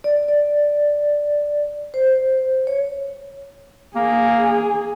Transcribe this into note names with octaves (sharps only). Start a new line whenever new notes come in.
D5
D5
C5
C#5
A#3 G#4